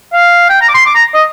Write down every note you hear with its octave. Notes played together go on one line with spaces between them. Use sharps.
F5
G5
A#5
D6
C6
D6
A#5
D#5